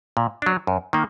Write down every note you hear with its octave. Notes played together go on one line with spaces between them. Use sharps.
A#2
F#3 D4
F#2
D#3 A#3